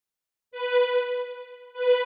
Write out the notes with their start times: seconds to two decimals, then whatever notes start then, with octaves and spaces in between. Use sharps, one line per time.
0.51 B4
1.73 B4